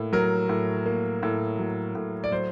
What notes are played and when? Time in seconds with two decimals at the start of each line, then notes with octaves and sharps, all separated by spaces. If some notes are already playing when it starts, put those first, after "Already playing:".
Already playing: A2 A#3
0.13 F#3 A#4
0.49 A2
0.86 A#3
1.23 A2
1.59 F#3
1.95 A2
2.24 D5
2.32 F#3 C5